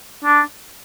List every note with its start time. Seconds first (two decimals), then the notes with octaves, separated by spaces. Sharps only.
0.25 D4